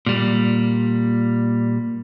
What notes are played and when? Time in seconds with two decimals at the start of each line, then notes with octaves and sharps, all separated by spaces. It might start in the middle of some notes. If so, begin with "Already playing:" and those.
0.06 A#2 G3